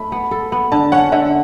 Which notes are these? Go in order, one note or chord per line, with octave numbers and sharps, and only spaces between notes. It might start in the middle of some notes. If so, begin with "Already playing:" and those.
Already playing: A3 B5
B3
A4
B3
D3 A5
C#4 F#5
D3 E5